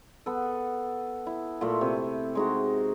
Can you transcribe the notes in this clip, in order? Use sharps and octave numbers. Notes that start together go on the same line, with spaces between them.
B3 A4
E4
A#2 A3
C3
G#3 D#4 F#4